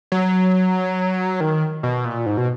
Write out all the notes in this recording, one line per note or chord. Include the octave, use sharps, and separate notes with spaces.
F#3
D#3
B2
A#2
G#2
B2